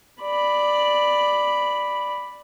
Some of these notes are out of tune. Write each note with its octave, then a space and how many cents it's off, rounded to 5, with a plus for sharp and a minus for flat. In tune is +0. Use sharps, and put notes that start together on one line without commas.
D5 +5 B5 +0